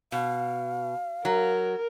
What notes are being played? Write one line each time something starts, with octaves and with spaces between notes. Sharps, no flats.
B2 F5
F#3 A#4